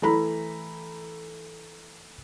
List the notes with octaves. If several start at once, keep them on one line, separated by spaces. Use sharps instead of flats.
E3 A3 A#5 B5